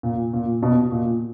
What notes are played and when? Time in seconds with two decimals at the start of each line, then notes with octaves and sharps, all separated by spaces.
0.03 A#2
0.34 A#2
0.63 B2
0.92 A#2